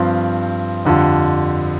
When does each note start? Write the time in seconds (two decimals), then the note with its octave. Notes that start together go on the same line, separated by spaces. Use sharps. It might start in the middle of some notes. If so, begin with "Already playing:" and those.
Already playing: G2 F3 C4
0.85 F2 D3 G3 D4 F4